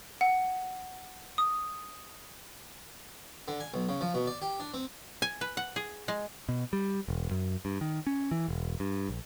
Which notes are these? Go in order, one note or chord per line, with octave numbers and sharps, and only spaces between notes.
F#5
D#6
D3
G#5
B1
C#3
F3
B2
D5
G4
D4
C4
G#5
B4
F#5
G#4
G#3
B2
G3
E1
F#2
G2
D#3
C#4
E3
E1
G2
A#1